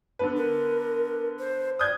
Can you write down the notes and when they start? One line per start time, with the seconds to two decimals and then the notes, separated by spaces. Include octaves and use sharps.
0.19 D3 B3 B4
0.37 A#4
1.39 C5
1.79 D5 D#6 G6 G#6